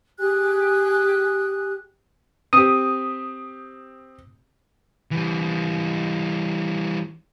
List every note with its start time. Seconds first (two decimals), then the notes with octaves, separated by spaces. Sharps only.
0.18 G4 G#4 G#5 F#6
2.53 C4 G4 D#6
5.11 E3 G3